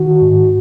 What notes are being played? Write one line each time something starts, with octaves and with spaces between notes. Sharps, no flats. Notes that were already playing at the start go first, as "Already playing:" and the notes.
Already playing: D#3 F#4
G#2